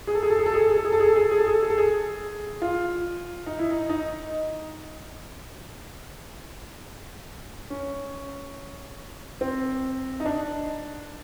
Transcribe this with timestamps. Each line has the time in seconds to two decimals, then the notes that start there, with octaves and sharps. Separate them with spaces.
0.07 G#4
0.15 A4
0.23 G#4
0.30 A4
0.39 G#4
0.46 A4
0.54 G#4
0.61 A4
0.69 G#4
0.77 A4
0.85 G#4
0.92 A4
1.00 G#4
1.08 A4
1.16 G#4
1.23 A4
1.31 G#4
1.39 A4
1.46 G#4
1.54 A4
1.63 G#4
1.70 A4
1.78 G#4
2.62 F4
3.46 D#4
3.59 E4
3.71 D#4
3.89 D#4
7.70 C#4
9.41 C4
10.20 D#4
10.25 D4